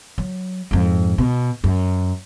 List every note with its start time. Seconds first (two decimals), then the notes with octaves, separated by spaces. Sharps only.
0.18 F#3
0.71 F2 G#2
1.18 B2
1.64 F#2